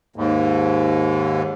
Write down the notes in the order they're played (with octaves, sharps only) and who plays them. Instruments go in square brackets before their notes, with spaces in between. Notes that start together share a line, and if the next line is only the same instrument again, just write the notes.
[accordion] D#2 G#2